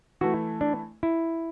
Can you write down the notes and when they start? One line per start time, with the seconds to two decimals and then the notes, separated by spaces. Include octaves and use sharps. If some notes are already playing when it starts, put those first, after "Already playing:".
0.21 E3 A3 E4 F#4
0.61 D4
1.03 E4